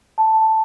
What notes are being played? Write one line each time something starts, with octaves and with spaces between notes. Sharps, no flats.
A5